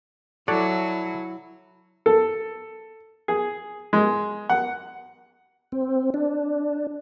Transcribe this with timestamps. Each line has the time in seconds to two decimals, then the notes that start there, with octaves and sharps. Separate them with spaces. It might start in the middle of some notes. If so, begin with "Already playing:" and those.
0.48 F#3 E4 A4 C#5 D5 F#5
2.06 A4
3.28 G#4
3.93 G#3
4.49 F#5
5.72 C4
6.14 D4